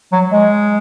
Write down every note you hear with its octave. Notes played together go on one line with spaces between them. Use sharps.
F#3
G#3